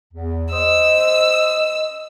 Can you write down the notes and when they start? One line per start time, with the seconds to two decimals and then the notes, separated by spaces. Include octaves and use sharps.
0.13 E2
0.53 C5 D#5 D#6 E6